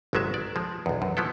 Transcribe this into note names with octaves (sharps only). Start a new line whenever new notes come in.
G1 C2 F#3 G#3 E5
D5
F3 G#3
B1 E2
F#2
F3 F#3 B3 E4 A4